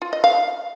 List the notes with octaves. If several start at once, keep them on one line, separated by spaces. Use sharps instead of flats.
F4
D#5
F5